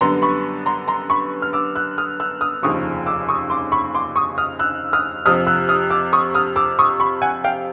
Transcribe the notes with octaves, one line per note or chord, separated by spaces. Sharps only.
F#2 D3 G3 B3 A#5 C6
B5 C#6
A#5 C6
A#5 C6
B5 C#6
F6
D6 E6
E6 F#6
D#6 F6
E6 F#6
D#6 F6
F1 D#2 C#3 F3 C#6 D#6
D6 E6
C#6 D#6
C6 D6
B5 C#6
C6 D6
C#6 D#6
D#6 F6
E6 F#6
D#6 F6
F2 C3 F3 D#6 F6
E6 F#6
D#6 F6
D6 E6
C#6 D#6
D#6 F6
D6 E6
C#6 D#6
B5 C#6
F#5 G#5
F5 G5